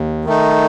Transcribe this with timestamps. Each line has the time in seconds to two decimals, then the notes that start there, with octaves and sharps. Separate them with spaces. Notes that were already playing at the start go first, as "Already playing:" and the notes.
Already playing: D#2
0.25 D#3 A3 D#4